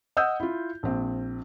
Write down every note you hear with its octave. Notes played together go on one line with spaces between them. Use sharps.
D#5 F#5 D#6 E6 G6
E4 F4
A#1 C4